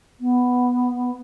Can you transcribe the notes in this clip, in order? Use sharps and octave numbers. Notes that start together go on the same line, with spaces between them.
B3